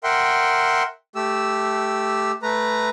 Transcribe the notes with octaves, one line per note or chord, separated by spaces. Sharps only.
A#4 E5 F#5 G5 C6
A3 G4 E6
A3 B4 A#5